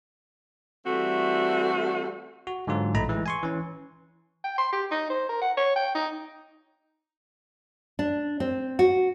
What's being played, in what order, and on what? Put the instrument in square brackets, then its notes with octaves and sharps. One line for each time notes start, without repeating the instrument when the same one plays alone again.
[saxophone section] E3 G3 A3 C4 F#4
[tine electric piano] F#4
G#2 D3 F#3 F4
A#1 A2 A3 D#4 A#5 B5
E3 G#3 E4
G#5 C6 C#6
E3 C#4
[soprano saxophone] G5
C6
G4
D#4
C5
A#4
F#5
C#5
G5
D#4
[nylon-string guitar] D4
C4
F#4